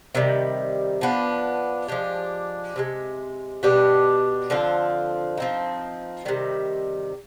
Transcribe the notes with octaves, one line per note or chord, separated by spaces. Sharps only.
C3 D#3 G3
F3 B3 D4
F3 G#3 D4 G4
C3 D#3 G#3
B2 B3 D4 G4
D3 F3 C4 F4
F3 C4 D#4
C3 D#3 G3